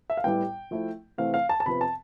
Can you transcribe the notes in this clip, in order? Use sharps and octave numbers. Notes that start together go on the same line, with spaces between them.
E5
F5
A2 G3 B3 E4 G5
F3 A3 E4
C3 E3 A3 C4 F5
F5
A5
A5
C3 F3 B3 B5
A5